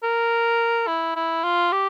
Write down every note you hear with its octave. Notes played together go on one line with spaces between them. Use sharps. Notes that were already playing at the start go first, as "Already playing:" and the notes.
A#4
E4
E4
F4
G4